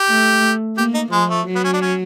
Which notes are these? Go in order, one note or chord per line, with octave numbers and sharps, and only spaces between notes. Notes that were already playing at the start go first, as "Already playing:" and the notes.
Already playing: G4
A3
A#3 G4
D#4
F3 G#3
A3
F#3
B3
C#4
D4
C#4